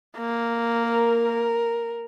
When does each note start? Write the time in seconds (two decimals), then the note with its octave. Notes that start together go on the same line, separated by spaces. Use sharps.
0.17 A#3
0.84 A#4